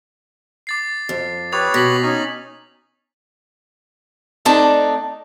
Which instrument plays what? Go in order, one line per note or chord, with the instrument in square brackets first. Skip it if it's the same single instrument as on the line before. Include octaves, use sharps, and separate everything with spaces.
[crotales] D6 A6 C7
[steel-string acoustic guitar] F2
[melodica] G4 B4 C#5 [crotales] D#6 A6 F7
[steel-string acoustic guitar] B2 [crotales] A#6 B6 F#7
[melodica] C#4 D#4 G#5
[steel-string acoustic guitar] A3 C4 D4 D#4 D5 A5